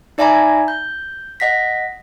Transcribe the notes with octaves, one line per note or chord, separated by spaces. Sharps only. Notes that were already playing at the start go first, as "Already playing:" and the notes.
D#4 D5 E5 G#5 A#5 B5
G6
D#5 F#5 A#6 B6